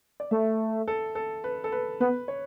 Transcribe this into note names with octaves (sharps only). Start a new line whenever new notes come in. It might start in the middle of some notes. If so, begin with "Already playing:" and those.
D5
A3 E5
A4
A4
B4
A4
B4
B3 B4
C#5